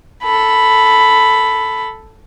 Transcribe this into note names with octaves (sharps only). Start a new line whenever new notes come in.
A4 B5